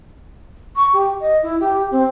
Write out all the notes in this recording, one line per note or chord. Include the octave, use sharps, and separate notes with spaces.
C#6
G4
D#5
E4
G4
C4